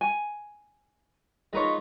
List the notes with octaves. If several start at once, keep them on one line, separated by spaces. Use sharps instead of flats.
G#5
G#2 D#4 F4 A#4 B4 C#5